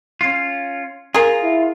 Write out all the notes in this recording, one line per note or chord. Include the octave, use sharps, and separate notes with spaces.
C#4 F4
F4 G#4 A#4
E4